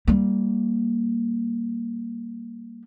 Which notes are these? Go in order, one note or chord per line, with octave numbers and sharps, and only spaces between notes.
G3 A#3